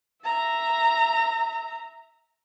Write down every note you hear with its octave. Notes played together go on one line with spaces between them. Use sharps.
E5 A#5